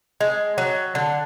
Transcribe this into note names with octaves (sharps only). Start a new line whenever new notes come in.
G#3
F#3
D3